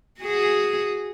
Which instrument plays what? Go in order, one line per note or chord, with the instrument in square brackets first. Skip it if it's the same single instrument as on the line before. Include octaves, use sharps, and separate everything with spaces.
[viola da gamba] F#4 G#4